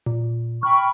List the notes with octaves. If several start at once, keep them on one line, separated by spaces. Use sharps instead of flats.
A#2
G5 B5 C#6 F6